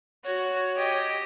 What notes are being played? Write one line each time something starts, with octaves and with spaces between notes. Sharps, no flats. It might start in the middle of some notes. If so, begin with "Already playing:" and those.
F#4 C#5
G4 D#5